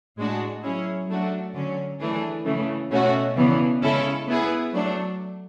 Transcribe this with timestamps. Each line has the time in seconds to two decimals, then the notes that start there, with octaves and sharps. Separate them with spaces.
0.17 A2 G#3 D4 F#4
0.63 F#3 C#4 E4 G#4 C#5
1.08 F#3 A3 D4 F#4
1.54 D3 F#3 C#4
2.00 E3 A3 D4 G#4
2.45 C#3 E3 A3
2.90 B2 A3 C#4 F#4
3.36 C#3 E3 B3 D4
3.82 C#3 G#3 C#4 E4 A4
4.28 B3 E4 G#4 B4
4.73 F#3 A3 D4